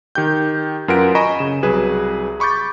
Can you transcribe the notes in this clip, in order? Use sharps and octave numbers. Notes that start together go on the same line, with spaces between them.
D#3 G4 G5 G6
F#2 F4 A#4 B4 F#5 D7
D#5 G#5 A#5 B5 C#6 E7
C#3 E7
C2 F#3 G#4 B4
B5 C#6 D6 G6 A6